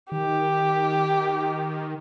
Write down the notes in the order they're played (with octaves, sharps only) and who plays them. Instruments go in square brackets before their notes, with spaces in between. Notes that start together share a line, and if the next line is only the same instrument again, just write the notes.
[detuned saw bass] D#3 [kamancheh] G4